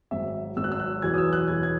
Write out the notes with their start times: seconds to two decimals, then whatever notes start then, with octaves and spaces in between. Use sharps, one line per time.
0.11 G#1 G#2 F#3 E5
0.56 G#1 G#2 F#3 E6
0.64 F#6
0.72 E6
0.79 F#6
1.02 E2 B2 F#3 G#6
1.14 D#6
1.18 E6
1.33 F#6
1.48 E2 B2 F#3 G#6
1.63 G#6